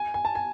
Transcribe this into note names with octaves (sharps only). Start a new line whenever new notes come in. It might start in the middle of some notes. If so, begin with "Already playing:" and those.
Already playing: G#5
G#5
A5
G#5